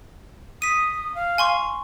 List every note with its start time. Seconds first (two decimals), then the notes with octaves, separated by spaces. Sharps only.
0.62 D#6 B6 D#7
1.15 F5
1.38 G#5 C6 C#6